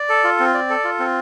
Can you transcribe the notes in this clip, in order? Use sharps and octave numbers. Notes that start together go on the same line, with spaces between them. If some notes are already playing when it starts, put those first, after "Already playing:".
Already playing: D5
A4
F4
C4
D5
A4
F4
C4